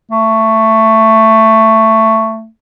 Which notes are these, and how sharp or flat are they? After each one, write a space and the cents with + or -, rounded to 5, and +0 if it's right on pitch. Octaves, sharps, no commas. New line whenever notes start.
A3 +15